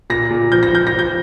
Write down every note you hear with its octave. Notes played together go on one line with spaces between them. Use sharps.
A#2 A#6
A#2
F3 G6
A#6
F3 G6
A#6
F3
G6